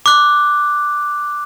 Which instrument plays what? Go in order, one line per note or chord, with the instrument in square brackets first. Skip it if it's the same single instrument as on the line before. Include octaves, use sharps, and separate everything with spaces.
[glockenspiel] D6 F#6